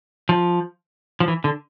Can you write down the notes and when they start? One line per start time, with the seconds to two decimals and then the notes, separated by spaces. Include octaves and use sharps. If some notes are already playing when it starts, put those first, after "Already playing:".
0.29 F3
1.20 F3
1.28 E3
1.44 D3